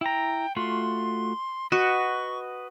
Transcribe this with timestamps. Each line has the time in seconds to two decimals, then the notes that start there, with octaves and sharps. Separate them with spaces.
0.01 E4 G5 A#5
0.56 A3 F4 F#4 C6
1.72 F#4 B4 D#5 C#6